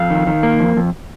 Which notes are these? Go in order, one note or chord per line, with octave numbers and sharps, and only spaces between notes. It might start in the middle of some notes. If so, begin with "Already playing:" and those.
Already playing: F2 F5
D#3
D#3
A#3
F2
F2